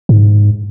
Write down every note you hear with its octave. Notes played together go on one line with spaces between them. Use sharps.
G#2